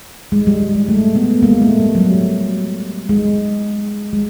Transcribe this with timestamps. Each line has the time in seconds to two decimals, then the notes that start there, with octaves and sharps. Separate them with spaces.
0.32 G#3
0.47 G3
0.60 G3
0.75 G#3
0.88 A3
1.16 A3 B3
1.43 G#3 A#3
1.62 A3
1.80 G3
1.95 F#3
1.99 G3
3.09 G#3
4.13 G#3